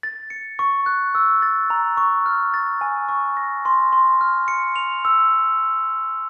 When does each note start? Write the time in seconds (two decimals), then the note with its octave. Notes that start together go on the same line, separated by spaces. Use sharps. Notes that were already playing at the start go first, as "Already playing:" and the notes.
0.03 A6
0.30 C#7
0.59 C#6
0.86 F#6
1.15 E6
1.42 A6
1.70 A#5
1.97 C#6
2.26 F6
2.54 A6
2.81 G#5
3.09 C#6
3.37 A#6
3.65 C6
3.93 C6
4.21 F6
4.48 C#7
4.76 F7
5.05 E6